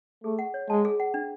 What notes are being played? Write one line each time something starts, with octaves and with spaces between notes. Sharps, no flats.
A3 G#4
F#5
C#5
G#3 A5
G#4
F#5
D4